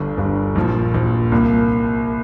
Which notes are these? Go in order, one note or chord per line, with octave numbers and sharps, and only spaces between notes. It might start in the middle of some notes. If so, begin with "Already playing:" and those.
Already playing: G1 G2 D3
G1 G2 D3
A#1 A#2 F3
A#1 A#2 F3
C2 A#2 A#3 F4